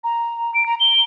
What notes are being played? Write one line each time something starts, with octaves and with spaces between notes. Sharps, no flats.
A#5
D7
A#5
G7